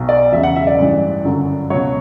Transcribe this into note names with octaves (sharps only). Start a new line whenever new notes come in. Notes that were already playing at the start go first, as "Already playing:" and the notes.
Already playing: B1 B2 F#3
D5
E1 E2 C#3 F#3 E5
F#5
E5
D5
A1 G2 E3
G1 F#2 D3 F#3
C#2 B2 F#3 C#5